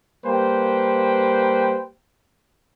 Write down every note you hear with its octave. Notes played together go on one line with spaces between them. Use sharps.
G3 A#3 B4 C5 G5